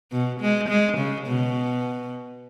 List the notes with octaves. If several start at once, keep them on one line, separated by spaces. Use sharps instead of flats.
B2
G#3
G#3
C#3
B2